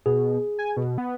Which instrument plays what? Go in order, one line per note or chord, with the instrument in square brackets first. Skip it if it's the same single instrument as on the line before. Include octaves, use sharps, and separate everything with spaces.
[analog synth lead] B2 [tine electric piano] G#4
[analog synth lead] G#5
B2
B3